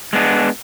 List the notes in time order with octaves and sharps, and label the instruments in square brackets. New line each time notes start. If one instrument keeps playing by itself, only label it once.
[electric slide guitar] G#3 B3 D4